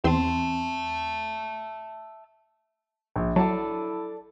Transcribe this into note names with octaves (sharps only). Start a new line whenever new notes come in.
E2 C4 E5 A5 C6
A#1
F#3 E4 A4 D5 A5